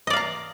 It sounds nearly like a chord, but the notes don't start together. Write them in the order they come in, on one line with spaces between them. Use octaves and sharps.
D#5 D5 F5 A#5